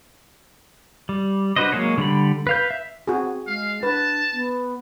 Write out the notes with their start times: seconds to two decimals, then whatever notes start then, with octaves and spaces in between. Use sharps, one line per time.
1.09 G3
1.56 D4 F#4 B4 C5 D#5
1.72 F#3 G#3 A#3 G#4 C#5
1.98 D3 G3 B5
2.47 B4 F5 G6
2.71 E5
3.08 C4 F#4 G#4
3.47 G#3 F5
3.83 D4 B4 A5
4.33 B3